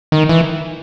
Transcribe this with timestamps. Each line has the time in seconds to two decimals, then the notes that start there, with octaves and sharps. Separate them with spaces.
0.12 D#3
0.29 E3